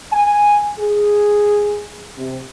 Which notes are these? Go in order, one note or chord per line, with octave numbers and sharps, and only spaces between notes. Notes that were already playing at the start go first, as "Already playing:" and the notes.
G#5
G#4
C3